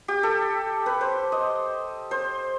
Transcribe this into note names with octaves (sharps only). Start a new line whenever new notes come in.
G4
A4
B4
C5
D#5
C5